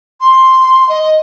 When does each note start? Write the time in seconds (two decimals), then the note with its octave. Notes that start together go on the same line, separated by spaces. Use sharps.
0.21 C6
0.89 D#5